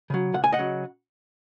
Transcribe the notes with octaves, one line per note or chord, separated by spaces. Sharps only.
C#3 F#3
C#2 F#5
G#5
D#5 F#5
C#3 F#3